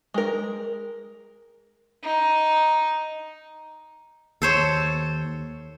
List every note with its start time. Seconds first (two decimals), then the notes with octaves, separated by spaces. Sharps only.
0.14 G#3 A#4
2.03 D#4
4.42 D#2 A4 C5 C#5